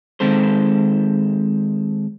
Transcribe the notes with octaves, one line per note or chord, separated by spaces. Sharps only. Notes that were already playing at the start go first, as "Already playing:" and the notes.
D#3 G#3 C4 A4 C5